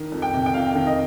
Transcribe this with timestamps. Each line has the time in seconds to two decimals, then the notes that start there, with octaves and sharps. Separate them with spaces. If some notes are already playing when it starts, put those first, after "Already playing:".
Already playing: D#3
0.12 F2
0.22 G5
0.34 C3
0.46 G5
0.54 F2 F5
0.75 D#3
0.86 D#5